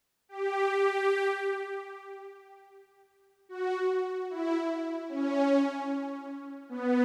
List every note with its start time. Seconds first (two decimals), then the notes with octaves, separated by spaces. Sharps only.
0.29 G4
3.49 F#4
4.30 E4
5.09 C#4
6.69 B3